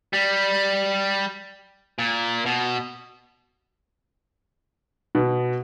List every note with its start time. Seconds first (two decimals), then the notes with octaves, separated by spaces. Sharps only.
0.13 G3
1.99 A#2
2.46 B2
5.15 B2